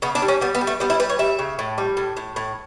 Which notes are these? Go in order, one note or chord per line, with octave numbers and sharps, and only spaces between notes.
C#3 B3
D4
G3
C#4
G3 B3
B3
G3
A3
G3 B3
E4
G3 B4
C#5
G3 E5
C#3
A2
G3
A2
A2
A2